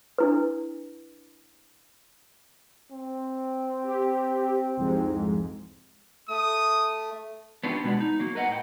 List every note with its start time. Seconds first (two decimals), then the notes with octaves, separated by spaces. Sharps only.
0.18 D4 E4 B4
2.91 C4
3.83 G4
4.77 C2 F2 G#2
6.29 A3 D#6
7.63 B3 C#4 D4 F4 G4
7.84 B2 G#3 B3 D4
8.00 D#4
8.20 F#3 A#3
8.35 A#4 B4 D#5 F5 F#5
8.48 A2 G5